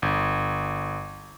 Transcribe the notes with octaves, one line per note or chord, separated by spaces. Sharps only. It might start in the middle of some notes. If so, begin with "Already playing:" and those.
G1